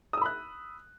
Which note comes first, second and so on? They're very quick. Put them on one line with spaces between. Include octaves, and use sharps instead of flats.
D#6 E6 B5 F#6